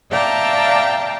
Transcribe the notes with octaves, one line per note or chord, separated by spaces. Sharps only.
D5 E5 F5 G5 A5 A#5